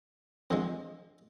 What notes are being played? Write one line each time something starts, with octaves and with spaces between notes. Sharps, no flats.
F2 D3 F3 G#3